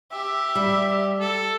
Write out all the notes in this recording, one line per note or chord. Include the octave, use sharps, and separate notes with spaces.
G4 E5
G3
A4